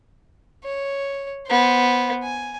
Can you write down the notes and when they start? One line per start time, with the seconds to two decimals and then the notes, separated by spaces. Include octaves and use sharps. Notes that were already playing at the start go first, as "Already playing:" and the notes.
0.64 C#5
1.47 B3 C5
2.23 G#5